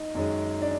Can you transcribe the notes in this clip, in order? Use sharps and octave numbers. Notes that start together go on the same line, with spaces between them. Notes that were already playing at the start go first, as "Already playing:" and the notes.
Already playing: D#4 D#5
F#2 D#3 G#3 C#4
D4 D5